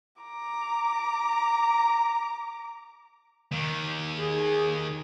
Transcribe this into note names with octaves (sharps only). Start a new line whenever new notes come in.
A#5 D6
D#2 D#3
G#4